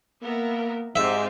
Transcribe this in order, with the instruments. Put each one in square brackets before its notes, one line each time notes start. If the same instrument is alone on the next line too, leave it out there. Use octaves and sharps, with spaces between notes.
[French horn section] A#3 [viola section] B3 A#4 E5
[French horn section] G#2 [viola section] C4 F4 G4 [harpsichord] E5